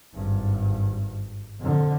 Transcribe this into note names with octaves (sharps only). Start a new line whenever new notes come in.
G#1 G2
F2 D3